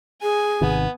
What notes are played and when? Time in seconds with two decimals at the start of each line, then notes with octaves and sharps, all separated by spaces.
0.22 G#4 G#5
0.62 G#1 C3 D#3 B3